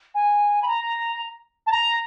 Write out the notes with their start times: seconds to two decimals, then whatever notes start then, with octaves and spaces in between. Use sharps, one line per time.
0.14 G#5
0.62 B5
0.67 A#5
1.66 A5
1.71 A#5